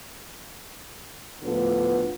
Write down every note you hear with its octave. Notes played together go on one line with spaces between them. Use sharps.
D2 A2 D3 F3 B3